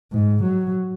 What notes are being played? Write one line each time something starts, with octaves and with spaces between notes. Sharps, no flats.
G#2
F#3